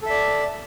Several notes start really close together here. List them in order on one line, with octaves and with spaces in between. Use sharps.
A4 E5 D5